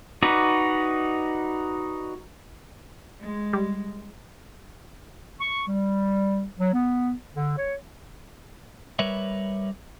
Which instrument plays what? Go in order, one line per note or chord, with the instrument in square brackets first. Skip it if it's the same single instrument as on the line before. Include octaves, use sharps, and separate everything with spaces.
[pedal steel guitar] D#4 F#4 B4 D5
[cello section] G#3
[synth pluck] G3
[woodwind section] C#6
G3
F#3
B3
D3
C#5
[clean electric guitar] G3 A#4 B4 C#5 E5